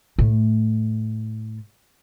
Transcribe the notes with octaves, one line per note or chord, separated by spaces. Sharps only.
A2 A3